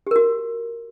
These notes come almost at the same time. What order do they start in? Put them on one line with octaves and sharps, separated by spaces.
G4 A#4 F#4